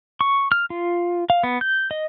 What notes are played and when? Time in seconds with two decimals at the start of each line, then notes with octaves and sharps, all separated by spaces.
0.21 C#6
0.52 F6
0.70 F4
1.30 F5
1.43 B3
1.61 G6
1.91 D#5